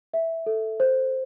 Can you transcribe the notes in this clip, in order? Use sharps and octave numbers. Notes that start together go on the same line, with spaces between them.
E5
A4
C5